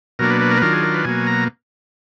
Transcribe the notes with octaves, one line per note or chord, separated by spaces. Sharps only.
B2 F#3 A#3 D4 A#4
B4
B4
A#4
B4
D#3 F#3 D4 F4 A#4
G#4
A#4
B4
B2 F#3 A#3 G#5
A#5